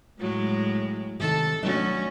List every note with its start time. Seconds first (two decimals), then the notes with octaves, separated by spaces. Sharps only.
0.18 A2 F#3 G#3
1.20 C3 D#3 A4 A5
1.63 F#3 A3 C#4 D4 F#4 D#5